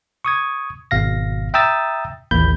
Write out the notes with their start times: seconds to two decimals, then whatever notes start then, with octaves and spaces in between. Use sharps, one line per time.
0.25 C#6 D#6 G#6
0.91 G#1 B2 F5 A#6
1.54 E5 G5 A#5 D#6 E6 A6
2.31 A1 D#2 E3 A#3 B5 G6